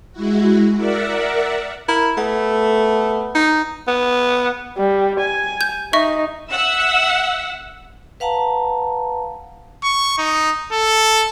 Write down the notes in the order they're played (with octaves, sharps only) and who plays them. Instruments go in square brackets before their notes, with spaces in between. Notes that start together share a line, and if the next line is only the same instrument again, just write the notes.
[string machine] G#3 E4 F#4
A#4 D5 E5 F#5
[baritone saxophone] E4 [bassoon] A#4
[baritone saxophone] A3 [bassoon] B3
[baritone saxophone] D#4
[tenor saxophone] B3
[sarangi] G3
G#5
[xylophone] G6
[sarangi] D#4 [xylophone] D#5 E5 C#6
[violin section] E5 F#5 E6
[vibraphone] B4 F5 F#5 A5 A#5
[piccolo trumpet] C#6
D#4
A4